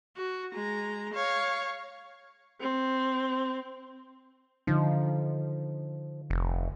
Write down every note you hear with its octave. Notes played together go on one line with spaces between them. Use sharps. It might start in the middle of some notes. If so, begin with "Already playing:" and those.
F#4
G#3 A#5
C#5 F5
C4
D3 F3 D#4
F1